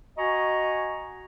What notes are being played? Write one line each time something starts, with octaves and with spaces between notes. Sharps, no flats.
F#4 D#5 G#5 A#5 C#6